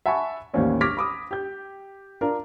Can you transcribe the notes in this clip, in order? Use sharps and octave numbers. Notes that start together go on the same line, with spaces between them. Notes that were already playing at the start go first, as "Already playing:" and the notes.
E5 F#5 G#5 A5 B5 C#6
A1 D#2 A#3 C4 C#4 D5
C#6 D6 F6 G#6 A#6 B6
B5 D6 D#6
G4 G6
D4 F4 A#4